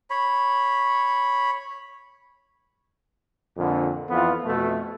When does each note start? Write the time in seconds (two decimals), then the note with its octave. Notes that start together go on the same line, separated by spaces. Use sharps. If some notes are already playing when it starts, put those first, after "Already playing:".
0.10 C#5 B5
3.57 F2 A#2 D3
4.09 F2 E3 B3 F4
4.44 F2 B2 A3